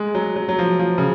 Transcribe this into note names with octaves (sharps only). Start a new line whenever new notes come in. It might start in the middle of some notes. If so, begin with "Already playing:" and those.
Already playing: G#3
F#3
F#3
F#3
F3
F3
C#3